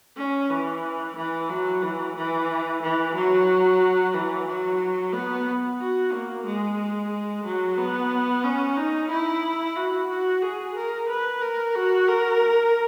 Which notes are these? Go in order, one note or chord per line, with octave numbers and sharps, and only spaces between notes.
C#4
E3
E3
F#3
E3
E3
E3
F#3
E3
F#3
B3
F#4
A#3
G#3
F#3
B3
C#4
D#4
E4
F#4
F#4
G#4
A#4
B4
A#4
F#4
A#4